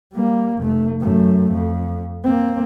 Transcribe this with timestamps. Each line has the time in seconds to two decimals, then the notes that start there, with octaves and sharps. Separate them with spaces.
0.13 G3 A#3
0.59 F1 A3
1.00 F#2 A3
1.53 F2
2.24 A#3 C4